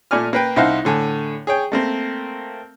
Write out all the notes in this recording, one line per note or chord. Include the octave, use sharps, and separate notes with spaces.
A#2 A3 D5 G#5 F6
A#3 B4 G5
C2 D#4 E4 C5 F5 F#5
A2 D3 G#5
G#4 C#5 G5
A3 A#3 C4